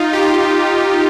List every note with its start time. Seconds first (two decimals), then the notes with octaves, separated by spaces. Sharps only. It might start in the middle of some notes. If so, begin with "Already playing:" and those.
Already playing: D#4 F4
0.13 G4
0.22 F4